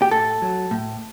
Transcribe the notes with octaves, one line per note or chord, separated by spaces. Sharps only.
G4
A2 A4
F#3
A2